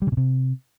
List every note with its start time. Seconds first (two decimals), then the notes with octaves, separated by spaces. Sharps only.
0.02 G3
0.07 C#3
0.12 B2
0.17 C3